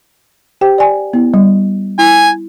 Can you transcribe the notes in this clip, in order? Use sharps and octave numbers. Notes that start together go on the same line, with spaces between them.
G4 C5 G5
D5 G#5
B3 E4
G3
E4 G#5